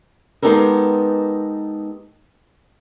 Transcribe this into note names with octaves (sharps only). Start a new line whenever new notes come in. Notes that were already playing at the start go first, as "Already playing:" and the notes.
G#3 B3 D#4 G4 A4 A#4